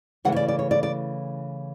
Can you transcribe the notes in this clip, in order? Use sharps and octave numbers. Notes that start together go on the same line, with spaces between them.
C#3 E3 A3 F#5
C#5
D5
D5
C#5
D5
D5